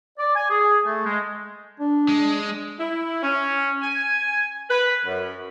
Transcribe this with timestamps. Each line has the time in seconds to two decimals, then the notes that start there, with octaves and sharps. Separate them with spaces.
0.18 D5
0.35 G#5
0.49 G#4
0.85 A3
1.05 G#3
1.80 D4
2.09 G#3
2.79 E4
3.22 C#4
3.82 G#5
4.70 B4
5.05 F#2